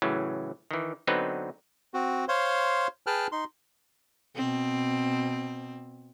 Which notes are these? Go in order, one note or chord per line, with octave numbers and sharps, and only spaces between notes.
A2 C#3 E3 F#3
D#3 E3
D3 F#3 B3 C4 D#4 B4
C4 F#4
C5 C#5 F5 C6
G#4 B4 G5 A5 F6 F#6
D#4 C6
B2 C4